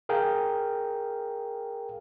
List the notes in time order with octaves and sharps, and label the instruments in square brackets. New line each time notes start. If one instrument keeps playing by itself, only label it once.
[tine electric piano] G#4 A#4 F5 G5